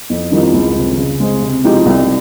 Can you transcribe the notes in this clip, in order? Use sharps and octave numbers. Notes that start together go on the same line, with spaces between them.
F2
D#3 G3 C4 F4
C#2
C3 F3
C#3
G#3 C4
C3
F3 G#3 D#4 G4
C2